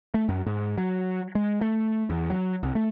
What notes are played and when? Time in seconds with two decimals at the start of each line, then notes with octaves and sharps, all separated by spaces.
0.14 A3
0.29 F#2
0.46 G#2
0.78 F#3
1.35 G#3
1.61 A3
2.10 E2
2.30 F#3
2.63 C2
2.75 A3